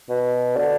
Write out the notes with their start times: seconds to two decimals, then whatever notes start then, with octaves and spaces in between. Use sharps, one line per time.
0.09 B2
0.56 D3